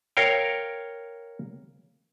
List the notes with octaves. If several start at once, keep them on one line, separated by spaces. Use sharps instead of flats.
A#4 C#5 F5 G5